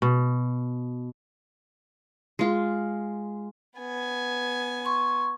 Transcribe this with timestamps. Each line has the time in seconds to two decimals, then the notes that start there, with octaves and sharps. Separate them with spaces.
0.02 B2
2.39 G#3 F4
3.78 B3 G#5
4.85 C6 C#6